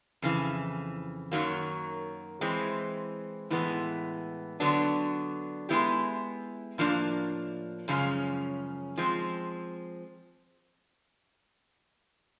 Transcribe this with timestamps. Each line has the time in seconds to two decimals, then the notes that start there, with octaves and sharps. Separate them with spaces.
0.22 F2 C#3 E3
1.31 F#2 D#3 F#3 A#3
2.41 E3 G#3 C4
3.50 A2 E3 G#3 B3
4.60 D3 F#3 B3 D4
5.69 G#3 B3 E4 G4
6.78 A2 F3 A#3 D4
7.88 F#2 C#3 F3 G#3 C#4
8.97 F3 G#3 C4